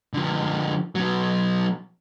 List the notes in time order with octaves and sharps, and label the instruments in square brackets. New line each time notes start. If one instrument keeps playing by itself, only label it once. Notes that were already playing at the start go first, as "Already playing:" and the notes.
[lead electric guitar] D3 F3
B2 F#3